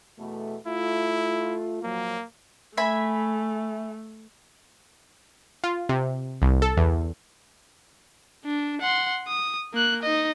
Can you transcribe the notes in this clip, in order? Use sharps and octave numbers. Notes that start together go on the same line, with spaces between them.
E2 B2 A3
A3 E4 F4
A#2 F3 F#3 A#3
A3 E5 G#5 B5
F4
C3
C2
A4
E2
D4
F#5 C6
D#6
A#3 F#6
D#4 D#5